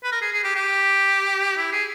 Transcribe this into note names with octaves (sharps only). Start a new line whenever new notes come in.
B4
A#4
G#4
G#4
G4
G4
E4
G#4